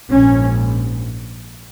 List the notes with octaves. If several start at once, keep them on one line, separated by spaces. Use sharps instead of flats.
A#1 G#2 C#4